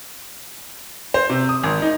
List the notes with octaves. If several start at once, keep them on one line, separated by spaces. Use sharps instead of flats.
C5
C3
D#6
G#1
D#4